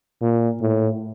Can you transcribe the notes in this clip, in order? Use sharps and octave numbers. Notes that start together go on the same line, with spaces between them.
A#2
A2